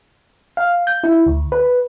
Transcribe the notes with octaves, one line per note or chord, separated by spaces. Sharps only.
F5
G6
E4
D2
B4